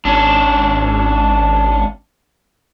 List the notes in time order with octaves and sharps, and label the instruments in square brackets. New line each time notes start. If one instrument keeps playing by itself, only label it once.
[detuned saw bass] G#1 [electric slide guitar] C#4 D4